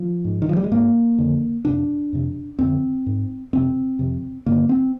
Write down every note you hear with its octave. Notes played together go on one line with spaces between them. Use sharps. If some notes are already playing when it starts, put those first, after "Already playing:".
Already playing: F3
G#2
D#3
F3
G3
G#3
G#2 A#3
F2 D3
F2 C3 D4
F2 C3
F2 D3 C4
G#2
F2 C3 C4
F2 C3
G2 D3 A#3
C4